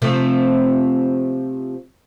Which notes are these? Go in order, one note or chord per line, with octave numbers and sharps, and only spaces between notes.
C3 F3 A3